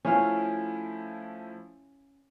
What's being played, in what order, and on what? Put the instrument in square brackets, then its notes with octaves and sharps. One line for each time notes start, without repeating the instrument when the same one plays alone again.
[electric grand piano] F3 A3 E4 [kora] C#4 F5